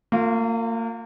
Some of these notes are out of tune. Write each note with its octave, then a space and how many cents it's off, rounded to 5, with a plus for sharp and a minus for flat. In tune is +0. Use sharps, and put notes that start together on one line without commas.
A#3 -35 F4 +20